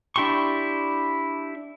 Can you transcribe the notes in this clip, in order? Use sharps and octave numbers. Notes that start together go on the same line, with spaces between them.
D4 E4 G4 C6 C#6